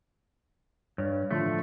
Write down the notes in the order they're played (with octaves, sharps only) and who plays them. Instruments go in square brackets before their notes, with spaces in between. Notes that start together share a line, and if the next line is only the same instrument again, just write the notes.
[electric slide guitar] G2 [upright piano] C#5
[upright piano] A2 D3 F3 [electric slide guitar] A3